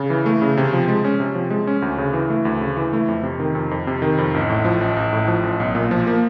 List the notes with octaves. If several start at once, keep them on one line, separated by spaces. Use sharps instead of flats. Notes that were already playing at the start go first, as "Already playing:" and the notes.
Already playing: C#3
E3
A3
C#3
C3
F3
G#3
C#4
C3
F3
G#3
C#4
D2
C#3
E3
A3
D2
C#3
E3
A3
F2
C3
D#3
F2
F2
C3
D#3
F2
A1
A2
F3
A1
A1
A2
F3
A1
B1
A#2
F3
A#3